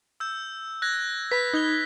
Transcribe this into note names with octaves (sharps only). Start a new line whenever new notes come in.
E6 G6
F#6 G#6 A#6
B4 B5 B6
D#4 G#6 G7